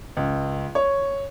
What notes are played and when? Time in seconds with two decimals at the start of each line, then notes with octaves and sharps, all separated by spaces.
0.17 C#2
0.75 C#5